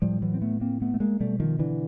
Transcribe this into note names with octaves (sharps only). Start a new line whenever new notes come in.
A2 F3 G3
E3 F#3
C4
A3 B3
A#3 C4
A3 B3
A3
G#3 A#3
B2 G3 A3
D#3 F3
D3 E3